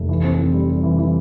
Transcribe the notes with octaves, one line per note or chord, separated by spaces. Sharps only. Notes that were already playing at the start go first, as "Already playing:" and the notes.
Already playing: F1
E3
C4
E3
G3
G3
E3
E3